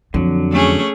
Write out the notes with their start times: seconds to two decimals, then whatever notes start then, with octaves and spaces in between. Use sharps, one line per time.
0.14 F2 D3 F#3
0.51 A3 C#4 G#4